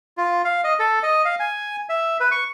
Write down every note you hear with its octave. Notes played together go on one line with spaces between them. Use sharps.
F4
F5
D#5
A4
D#5
F5
G#5
E5
B4
C#6